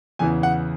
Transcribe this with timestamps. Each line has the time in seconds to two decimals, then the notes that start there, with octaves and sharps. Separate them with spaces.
0.19 E2 C#3 E3 G#5
0.43 F#5